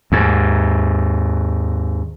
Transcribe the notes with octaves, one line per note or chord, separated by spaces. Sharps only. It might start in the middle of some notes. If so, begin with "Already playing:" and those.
D#2 G#2